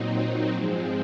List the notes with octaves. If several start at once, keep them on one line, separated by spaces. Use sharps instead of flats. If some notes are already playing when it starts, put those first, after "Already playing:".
Already playing: A#2 F#3 C4 D#4
G#2 F3 G#3 C4